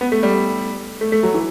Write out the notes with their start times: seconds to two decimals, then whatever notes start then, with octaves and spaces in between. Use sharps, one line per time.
0.01 B3
0.12 A3
0.23 G3
1.01 A3
1.12 A3
1.23 F#3
1.34 E3